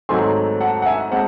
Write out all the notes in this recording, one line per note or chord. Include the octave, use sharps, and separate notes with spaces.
G#2 D#3 F#3 A3 C4 G#5 C6
F#5 A5
F#5
E5 G#5
G#3 C4 F#5 A5